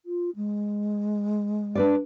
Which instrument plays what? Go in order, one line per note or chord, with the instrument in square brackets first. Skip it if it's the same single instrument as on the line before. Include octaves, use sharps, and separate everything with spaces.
[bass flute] F4
G#3
[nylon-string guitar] D4 B4 D5